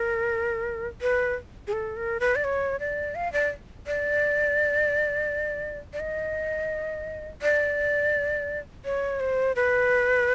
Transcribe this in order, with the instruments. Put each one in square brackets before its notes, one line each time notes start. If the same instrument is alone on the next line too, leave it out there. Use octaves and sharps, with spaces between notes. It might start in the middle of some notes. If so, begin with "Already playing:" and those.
Already playing: [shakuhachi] A#4
B4
G#4
A4
A#4
B4
D5
C#5
D5
F5
D5
D5
D5
D#5
D5
C#5
C5
B4